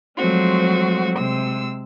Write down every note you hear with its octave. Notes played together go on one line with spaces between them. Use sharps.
F3 F#3 G#3 A3 C4 F#4
C3 G#3 E6